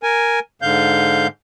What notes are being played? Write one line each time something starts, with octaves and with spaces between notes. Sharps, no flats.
A#4 G#5
G#2 D3 F5 G6